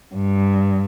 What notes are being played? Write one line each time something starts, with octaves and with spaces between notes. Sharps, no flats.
G2